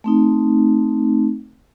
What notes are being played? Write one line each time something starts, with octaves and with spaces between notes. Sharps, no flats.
A3 C4 D#4